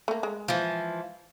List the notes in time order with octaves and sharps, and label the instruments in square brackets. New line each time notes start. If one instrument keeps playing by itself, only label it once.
[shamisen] A3 A#3
G#3
[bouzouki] E3 F3